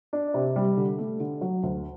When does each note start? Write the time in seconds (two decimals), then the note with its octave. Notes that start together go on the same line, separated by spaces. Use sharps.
0.13 D4
0.34 C3
0.56 G3
0.77 D3
0.98 A3
1.20 D3
1.41 F#3
1.63 D2